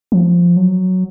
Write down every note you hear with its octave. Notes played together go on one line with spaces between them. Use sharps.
F3
F#3